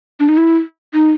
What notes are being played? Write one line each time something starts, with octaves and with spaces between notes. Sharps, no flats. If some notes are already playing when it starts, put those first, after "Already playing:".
D4
D#4
E4
D#4